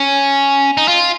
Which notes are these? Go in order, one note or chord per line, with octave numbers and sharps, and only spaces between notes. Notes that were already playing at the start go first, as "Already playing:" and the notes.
Already playing: C#4
D#4
F4